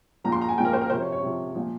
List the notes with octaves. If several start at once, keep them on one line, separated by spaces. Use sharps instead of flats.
A#2 F3 A#5
C6
A#5
G#5
A#2 F3 A#4 G5
C5
A#4
C3 F3 C5
C#5
C#5
C3 F3
A#2 F3